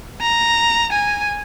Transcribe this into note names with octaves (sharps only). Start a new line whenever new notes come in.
A#5
G#5